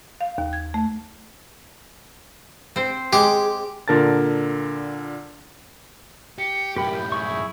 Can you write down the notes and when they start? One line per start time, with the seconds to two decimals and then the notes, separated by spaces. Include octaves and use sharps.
0.21 F5
0.38 D#2
0.53 G#6
0.74 A3
2.76 C4 C5
3.13 G#3 G4 G#4
3.88 A#2 D3 A#4 A5 A6
6.38 G4 C#7
6.76 F#2 A2 G4 A#4 G5 B5
6.94 G6
7.12 E4 G#4 C#6